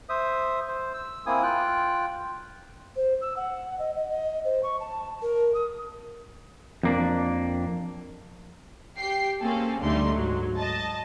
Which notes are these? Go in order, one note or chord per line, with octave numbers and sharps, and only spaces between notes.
C5 E5 D#6
C5
E6
A#3 C4 E4 G#5 D#6
F4 G5 F#6
C5
E6
F#5
D#5
D#5
D#5
C5
C#6
A5
A#4
D#6
F2 A#3 D4
G4 G5 C7
A#3 C4 C#4 G#4 A4
D2 D3 G3 A3 D#4 C6
G#2 F#3
D#5 A5